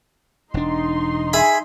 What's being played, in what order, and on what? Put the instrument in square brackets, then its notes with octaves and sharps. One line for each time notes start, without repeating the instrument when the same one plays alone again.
[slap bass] E1 D4 [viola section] D#4 C6
[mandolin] G#4 [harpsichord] E5 B5